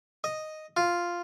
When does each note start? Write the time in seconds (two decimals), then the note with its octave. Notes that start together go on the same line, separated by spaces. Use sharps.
0.24 D#5
0.77 F4